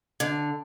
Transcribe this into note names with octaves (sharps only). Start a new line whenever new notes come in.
D3